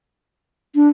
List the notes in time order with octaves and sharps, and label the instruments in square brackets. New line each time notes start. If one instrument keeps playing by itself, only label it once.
[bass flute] D4